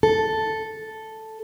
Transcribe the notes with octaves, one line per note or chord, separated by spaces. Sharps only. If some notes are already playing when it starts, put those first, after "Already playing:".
A4